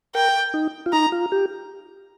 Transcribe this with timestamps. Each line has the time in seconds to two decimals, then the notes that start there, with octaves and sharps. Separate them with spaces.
0.15 A#4 G5
0.54 D#4
0.86 F4
0.92 D#4 A#5
1.12 F4
1.32 G4